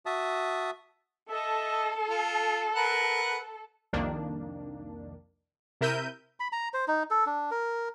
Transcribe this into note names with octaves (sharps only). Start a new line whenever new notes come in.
F#4 E5 A5 D#6
A4 D#5 E5
F4
A#4 B4 F#5
C2 F2 D#3 A#3 D4
C3 E4 A#4 E5 G6 D#7
B5
A#5
C5
D#4
A4
D4
A#4